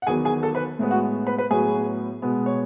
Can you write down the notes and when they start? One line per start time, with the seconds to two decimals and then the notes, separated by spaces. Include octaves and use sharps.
0.02 F#5
0.07 E2 D#3 F#3 B3 G#4 G#5
0.25 G#4 G#5
0.43 A4 A5
0.55 B4 B5
0.79 A2 G#3 B3
0.91 F#4 F#5
1.27 B4 B5
1.38 B4 B5
1.50 A2 F#3 B3 G#4 G#5
2.22 B2 G#3 B3
2.46 C#5